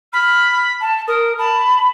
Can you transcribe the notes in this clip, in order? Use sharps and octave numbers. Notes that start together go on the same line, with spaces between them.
B5 F6
A5
A#4 D#6
A5 B5